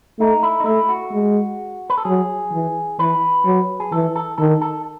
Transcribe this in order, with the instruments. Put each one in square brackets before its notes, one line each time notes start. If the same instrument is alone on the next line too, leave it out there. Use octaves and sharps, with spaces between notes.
[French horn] A3 [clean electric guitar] D#4
[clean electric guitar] E4
D#4
[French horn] A3 [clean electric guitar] E4
[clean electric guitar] F#4
[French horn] G#3
[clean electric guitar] B4
A4
[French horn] F#3 [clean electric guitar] G#4
[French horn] E3
[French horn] E3 [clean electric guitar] B4
[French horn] F#3
[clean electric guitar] G#4
[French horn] E3 [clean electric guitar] A4
[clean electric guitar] A4
[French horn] D#3 [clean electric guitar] A4
[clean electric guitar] A4